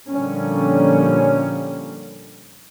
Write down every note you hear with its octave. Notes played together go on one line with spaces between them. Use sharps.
A#2 D3 F3 G3 A#3 C#4